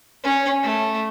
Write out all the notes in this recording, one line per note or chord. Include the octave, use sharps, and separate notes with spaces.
C#4
A3